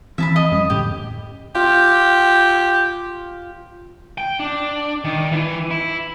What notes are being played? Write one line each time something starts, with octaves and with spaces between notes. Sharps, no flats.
E3 C4 E5 A5 B5
D#5
F2 G3 C#4
D2 A2 G4
F4 G4
G5
D4
D#3
E3
E4